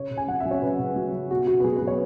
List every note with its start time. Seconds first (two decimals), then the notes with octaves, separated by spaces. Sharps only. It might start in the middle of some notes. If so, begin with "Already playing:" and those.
Already playing: C#3 C#5
0.11 C#3
0.17 G#5
0.28 F#3 F#5
0.40 F#3 E5
0.51 C#5
0.62 C#3 B4
0.79 C#3
0.96 F#3
1.13 F#3
1.31 B2 F#4
1.47 B2 F#4
1.60 B4
1.64 F#3 G#4
1.76 F#3 B4
1.87 C#5